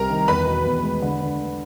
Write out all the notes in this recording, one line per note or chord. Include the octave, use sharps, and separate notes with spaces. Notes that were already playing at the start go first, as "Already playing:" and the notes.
Already playing: C2 C3 G3 A#4 A#5
D#3
E2 B4 B5
B2
E2
G#3
D3
D3